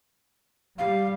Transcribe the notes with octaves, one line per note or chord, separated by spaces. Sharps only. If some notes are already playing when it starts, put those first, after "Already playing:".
G3 F5